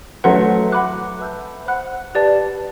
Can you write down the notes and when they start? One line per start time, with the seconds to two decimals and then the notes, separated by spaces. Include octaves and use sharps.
0.24 F#3 A3 B4 F#5 C6
0.72 F#5 B5 D6 F#6
1.19 B4 E5 A5 E6 G6
1.66 C5 F#5 B5 F#6
2.15 G4 B4 D5 A5